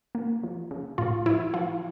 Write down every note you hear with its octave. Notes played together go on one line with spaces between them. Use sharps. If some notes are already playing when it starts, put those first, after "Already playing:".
A#3
F3
C#3
A2 F4
F3 E4
F3 F4